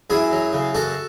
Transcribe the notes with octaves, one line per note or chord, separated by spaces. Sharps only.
F#2 E4 G#4
F#3
C#3
F#2 F#4 A4